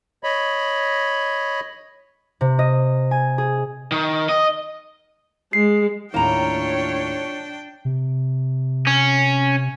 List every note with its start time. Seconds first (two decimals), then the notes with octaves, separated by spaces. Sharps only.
0.24 C#5 D#5 B5
2.41 C3
2.59 D#5
3.11 G#5
3.38 G#4
3.92 D#3
4.29 D#5
5.53 G#3 C7
6.14 D#2 A2 A#3 D4 F4 C#5 G5 A#5
7.85 C3
8.87 C#4